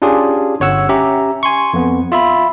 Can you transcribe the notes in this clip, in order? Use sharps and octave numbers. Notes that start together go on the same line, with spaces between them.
C#4 D4 F4 G4 G#4
G1 C#5 F#5 E6
C#4 G4 E5 A#5
G#5 C6 C#6
F2 B3
F4 E5 B5